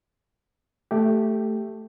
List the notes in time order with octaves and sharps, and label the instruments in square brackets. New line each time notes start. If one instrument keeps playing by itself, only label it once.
[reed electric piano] A3 G4